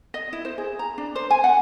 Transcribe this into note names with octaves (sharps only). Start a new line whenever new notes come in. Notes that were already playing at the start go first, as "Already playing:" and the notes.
D#5
E4
C5
G#4
A#5
D4
C5
G#5
F#5